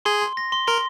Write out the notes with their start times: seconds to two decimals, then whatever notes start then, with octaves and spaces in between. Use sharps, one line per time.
0.05 G#4 C6
0.22 C6
0.37 A#6
0.52 C6
0.67 A#4 C6